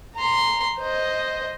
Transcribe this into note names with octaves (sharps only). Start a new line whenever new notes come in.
A#5 C6
C5 D#5